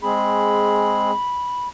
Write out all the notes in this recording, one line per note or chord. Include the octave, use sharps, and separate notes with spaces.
G#3 C4 G#4 B5